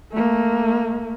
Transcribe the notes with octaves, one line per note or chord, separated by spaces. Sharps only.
A3 A#3